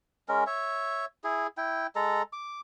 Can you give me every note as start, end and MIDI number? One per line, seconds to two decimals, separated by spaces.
0.29 0.44 56
0.29 0.44 61
0.29 0.44 70
0.47 1.05 73
0.47 1.05 76
1.24 1.47 64
1.24 1.47 68
1.57 1.87 64
1.57 1.87 79
1.96 2.22 56
1.96 2.22 69
1.96 2.22 82
2.33 2.61 86